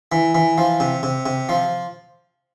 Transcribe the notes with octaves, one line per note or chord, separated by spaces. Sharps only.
E3
E3
F3
C3
C3
C3
F3